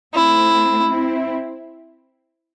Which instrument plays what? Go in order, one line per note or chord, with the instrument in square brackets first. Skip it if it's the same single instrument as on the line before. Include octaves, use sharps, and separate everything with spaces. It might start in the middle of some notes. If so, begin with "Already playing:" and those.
[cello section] A3 C4 [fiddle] E4
[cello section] C4 E4